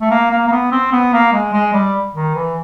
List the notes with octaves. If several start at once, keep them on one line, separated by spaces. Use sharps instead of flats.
A3
A#3
A#3
A#3
B3
C4
B3
A#3
G#3
G#3
G3
D#3
E3